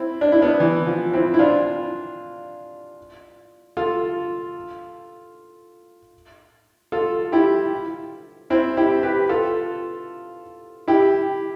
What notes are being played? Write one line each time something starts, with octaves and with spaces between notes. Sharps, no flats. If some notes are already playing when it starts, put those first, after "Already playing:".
Already playing: C4 E4
D4
E4
B3 D4
E3
F3
C4 E4
E4
D4 F4
F4 A4
F4 A4
E4 G4
C4 E4
E4 G4
G4 B4
F4 A4
E4 G4